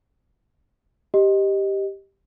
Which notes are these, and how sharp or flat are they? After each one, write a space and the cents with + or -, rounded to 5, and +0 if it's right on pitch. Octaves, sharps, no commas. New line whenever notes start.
G4 +0 D#5 +0